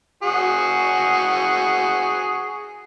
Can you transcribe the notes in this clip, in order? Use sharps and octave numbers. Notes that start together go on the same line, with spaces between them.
F#4 G#4